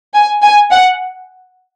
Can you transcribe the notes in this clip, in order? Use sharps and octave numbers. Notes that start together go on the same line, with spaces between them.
G#5
G#5
F#5